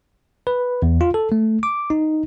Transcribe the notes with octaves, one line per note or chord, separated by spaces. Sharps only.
B4
E2
F4
A4
A3
D6
D#4